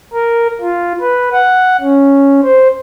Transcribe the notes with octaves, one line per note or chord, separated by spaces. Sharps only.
A#4
F4
B4
F#5
C#4
C5